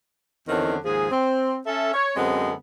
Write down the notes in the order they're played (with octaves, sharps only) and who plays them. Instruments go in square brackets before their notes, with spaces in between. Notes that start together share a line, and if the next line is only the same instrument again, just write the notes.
[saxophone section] E2 D3 D#3 F#3 C4 C#4
D#2 G#2 F3 G#4
C4
C#4 A4 E5
C#5
F#2 D3 G#3 B3 C4